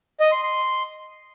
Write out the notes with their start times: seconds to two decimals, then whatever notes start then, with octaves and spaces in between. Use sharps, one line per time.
0.20 D#5
0.32 C6
0.43 C6